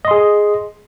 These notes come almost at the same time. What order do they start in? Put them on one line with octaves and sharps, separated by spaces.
D#5 C6 G#4